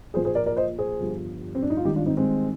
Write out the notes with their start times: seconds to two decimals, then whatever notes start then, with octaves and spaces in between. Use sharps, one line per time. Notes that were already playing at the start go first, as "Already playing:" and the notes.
0.14 A#1 A#2 F3 G#4 C5
0.25 G#4 C5
0.35 A#4 D5
0.46 A#4 D5
0.57 C5 D#5
0.78 G#4 C5
1.00 G1 G2 F3
1.55 C4
1.62 D4
1.70 D#4
1.77 F4
1.84 G#1 G2 D#3 D#4 G4
1.95 D4 F4
2.06 C4 D#4
2.17 G#3 C4